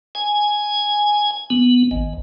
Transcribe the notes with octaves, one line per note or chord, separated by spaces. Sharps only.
G#5
B3
G#1